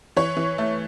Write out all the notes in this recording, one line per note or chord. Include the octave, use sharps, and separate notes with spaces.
E3 C#5
E3
A3